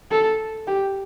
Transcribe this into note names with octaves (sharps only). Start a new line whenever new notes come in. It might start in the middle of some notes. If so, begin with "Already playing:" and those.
A4
G4